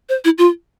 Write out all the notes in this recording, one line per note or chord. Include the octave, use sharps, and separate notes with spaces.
C5
E4
F4